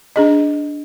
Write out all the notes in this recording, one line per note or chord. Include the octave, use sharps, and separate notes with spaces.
D4 G#4 D#5